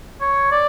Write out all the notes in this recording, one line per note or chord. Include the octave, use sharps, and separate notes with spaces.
C#5
D5